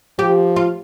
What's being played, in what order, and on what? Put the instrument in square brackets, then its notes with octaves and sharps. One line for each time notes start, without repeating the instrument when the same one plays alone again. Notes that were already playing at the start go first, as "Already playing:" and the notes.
[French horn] F3 [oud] G4
[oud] F4